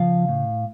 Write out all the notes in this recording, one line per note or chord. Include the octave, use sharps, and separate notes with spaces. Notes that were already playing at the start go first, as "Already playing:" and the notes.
Already playing: C#3 F3 F5
A2